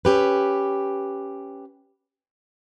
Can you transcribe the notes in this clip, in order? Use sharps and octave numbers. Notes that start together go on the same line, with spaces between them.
C#4 G4 B4